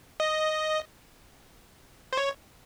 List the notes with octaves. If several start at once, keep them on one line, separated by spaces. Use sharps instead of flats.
D#5
C5
C#5